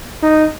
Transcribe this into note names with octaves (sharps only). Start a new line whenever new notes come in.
D#4